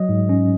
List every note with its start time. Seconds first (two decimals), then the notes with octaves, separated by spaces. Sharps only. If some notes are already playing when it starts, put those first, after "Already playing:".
Already playing: F#3 D#5
0.09 G#2
0.29 C#4